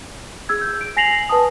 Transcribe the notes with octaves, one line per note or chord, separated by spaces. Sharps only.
G#4 E6 G#6
G6
D7
G#5 A#6 C7 F7 F#7
B4 G#5 A5 D#6